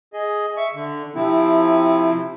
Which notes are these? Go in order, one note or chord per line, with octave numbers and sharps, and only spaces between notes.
G#4 D#5
E5 C#6
D3
C3 F3 C4 E4